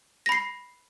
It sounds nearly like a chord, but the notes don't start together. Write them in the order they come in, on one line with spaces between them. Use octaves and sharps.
A#6 B5 C7